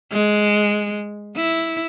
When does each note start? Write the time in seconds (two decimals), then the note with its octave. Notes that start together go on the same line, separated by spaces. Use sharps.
0.12 G#3
1.37 E4